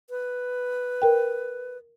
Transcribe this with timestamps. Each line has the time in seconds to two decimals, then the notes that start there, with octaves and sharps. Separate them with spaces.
0.10 B4
1.02 A#4 G5